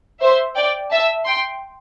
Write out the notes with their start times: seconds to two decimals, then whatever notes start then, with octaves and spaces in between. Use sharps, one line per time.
0.20 C5 E5
0.55 D5 G5
0.90 E5 A5
1.26 G5 C6